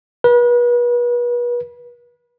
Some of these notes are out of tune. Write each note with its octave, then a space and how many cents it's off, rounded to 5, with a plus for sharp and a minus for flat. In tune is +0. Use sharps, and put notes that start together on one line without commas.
B4 -35